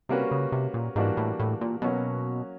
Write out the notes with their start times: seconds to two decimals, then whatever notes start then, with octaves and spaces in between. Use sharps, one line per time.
0.09 C3 G3 A#3 C#4 F#4 B4
0.31 C#3
0.52 C3
0.74 A#2
0.96 G#2 E3 G3 A#3 D4 F#4
1.17 A2
1.40 A2
1.61 A#2
1.82 B2 F#3 A#3 C#4 F#4